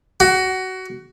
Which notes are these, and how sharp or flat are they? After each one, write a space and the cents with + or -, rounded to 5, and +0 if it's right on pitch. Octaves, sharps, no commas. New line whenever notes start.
F#4 +20